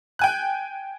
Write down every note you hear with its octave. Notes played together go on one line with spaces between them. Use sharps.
G5 G#5 F#6